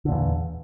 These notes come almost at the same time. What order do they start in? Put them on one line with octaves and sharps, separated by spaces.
D3 A#2 E2